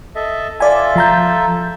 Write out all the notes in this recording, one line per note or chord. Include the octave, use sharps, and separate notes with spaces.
A4 D#5 E5
F4 A4 D5 E5 G#5
F3 A#5 G6